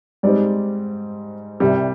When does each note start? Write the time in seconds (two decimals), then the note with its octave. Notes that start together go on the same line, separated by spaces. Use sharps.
0.23 G#2 G3 C4 D5
1.60 C2 C3 G3